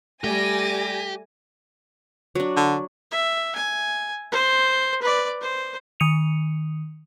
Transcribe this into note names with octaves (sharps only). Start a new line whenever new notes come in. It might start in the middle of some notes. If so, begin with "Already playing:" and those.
G3 A3 G4 D5 G#5 A#6
F#3 D4
D3
E5
G#5
C5
B4 D5
C5
D#3 D#6 C#7 D#7 F7